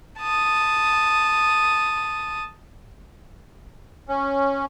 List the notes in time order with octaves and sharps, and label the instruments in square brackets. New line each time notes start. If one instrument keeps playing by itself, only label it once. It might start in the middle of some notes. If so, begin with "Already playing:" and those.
[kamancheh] A5 D#6
[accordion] C#4